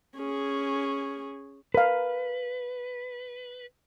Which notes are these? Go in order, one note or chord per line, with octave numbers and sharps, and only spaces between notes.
C#4 G#4
A#4 B4 F5